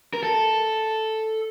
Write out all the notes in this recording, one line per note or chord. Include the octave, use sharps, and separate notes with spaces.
A#4
A4